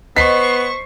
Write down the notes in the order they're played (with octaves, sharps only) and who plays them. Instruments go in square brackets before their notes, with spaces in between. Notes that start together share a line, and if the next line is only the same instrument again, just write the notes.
[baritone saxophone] B3 [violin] C5 C#6 [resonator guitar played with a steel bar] D#5 [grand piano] B6 C7